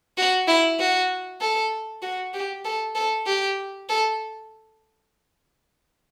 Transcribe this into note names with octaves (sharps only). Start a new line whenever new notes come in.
F#4
E4
F#4
A4
F#4
G4
A4
A4
G4
A4